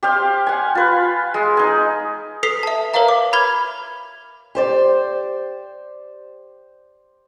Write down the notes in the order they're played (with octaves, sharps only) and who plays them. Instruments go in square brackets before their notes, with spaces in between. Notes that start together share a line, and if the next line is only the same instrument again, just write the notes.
[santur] G4 C5 F5
F#5 G#5
F4 B4
G#3
D#4 G#4
[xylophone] A4 B4 D#6 B6 C7 F7
E5 A5
A#4 B4 C#5 E5 F5 A#5
D6
B5 F6 G#6 G7
[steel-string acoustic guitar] G4 C5 D5